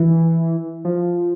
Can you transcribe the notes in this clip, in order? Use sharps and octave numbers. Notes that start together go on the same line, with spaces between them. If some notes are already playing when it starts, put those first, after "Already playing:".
Already playing: E3
F3